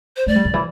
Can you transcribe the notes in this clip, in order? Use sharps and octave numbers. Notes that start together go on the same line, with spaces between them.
C5
A3 D5
G3
D3
E3